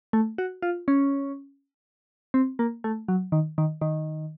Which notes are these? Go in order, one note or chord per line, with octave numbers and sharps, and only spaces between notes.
A3
F#4
F4
C#4
C4
A#3
A3
F#3
D#3
D#3
D#3